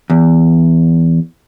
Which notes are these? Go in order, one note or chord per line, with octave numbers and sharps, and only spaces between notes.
E2